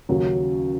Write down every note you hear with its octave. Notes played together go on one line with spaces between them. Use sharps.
D#2 C#3 F#3